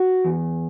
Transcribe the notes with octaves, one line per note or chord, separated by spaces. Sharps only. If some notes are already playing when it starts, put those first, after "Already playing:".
Already playing: F#4
E2